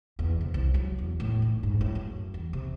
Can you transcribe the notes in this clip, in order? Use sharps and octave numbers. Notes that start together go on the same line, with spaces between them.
E2
C3
C2
F#3
E2
A2
F1
G#2
A2
F#2
E2
C3